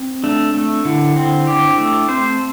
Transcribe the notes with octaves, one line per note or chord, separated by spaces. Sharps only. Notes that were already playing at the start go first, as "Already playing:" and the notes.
Already playing: C4
A3 D4
A3
D3 E4
C4
D4 G4
A3
C4 C5